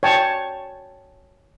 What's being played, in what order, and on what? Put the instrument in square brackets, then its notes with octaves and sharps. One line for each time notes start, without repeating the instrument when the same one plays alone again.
[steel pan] C#5 G5 A5